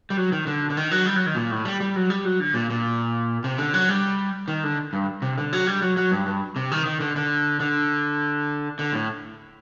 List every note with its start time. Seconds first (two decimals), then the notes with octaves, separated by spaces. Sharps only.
0.10 G3
0.17 F#3
0.32 D#3
0.47 D3
0.70 D3
0.77 D#3
0.91 F#3
1.06 G3
1.16 F#3
1.26 D#3
1.36 A#2
1.51 A2
1.65 G3
1.80 G3
1.96 F#3
2.10 G3
2.25 F#3
2.40 D3
2.54 A#2
2.70 A#2
3.44 C3
3.58 D3
3.74 F#3
3.89 G3
4.48 D#3
4.64 D3
4.93 G2
5.22 C3
5.38 D3
5.53 F#3
5.67 G3
5.82 F#3
5.97 F#3
6.12 G2
6.26 G2
6.56 C3
6.71 D#3
6.86 D#3
7.00 D3
7.16 D3
7.60 D3
8.79 D3
8.94 A2